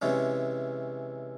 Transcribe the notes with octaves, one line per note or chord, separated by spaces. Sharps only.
C3 E3 G#3 C#4